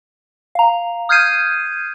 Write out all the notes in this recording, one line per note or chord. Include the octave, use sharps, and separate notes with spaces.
F5 A#5
D#6 F6 G6 G#6 C7 D#7